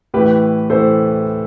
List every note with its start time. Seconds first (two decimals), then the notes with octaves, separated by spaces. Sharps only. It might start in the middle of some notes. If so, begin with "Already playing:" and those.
0.14 A2 E3 G4 B4
0.70 A2 E3 A4 C5